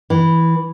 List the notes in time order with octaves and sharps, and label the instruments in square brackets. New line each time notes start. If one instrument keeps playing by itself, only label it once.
[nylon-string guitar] E3